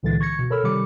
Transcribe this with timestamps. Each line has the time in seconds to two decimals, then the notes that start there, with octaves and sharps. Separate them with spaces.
0.03 C#2 A#2 D3 E3 G#3 A6
0.20 C#6 G#6 A#6 C#7
0.39 B2
0.50 A4 A#4 C#5 B5 E6 F6
0.63 C3 D#3 G3 B5 D6 C#7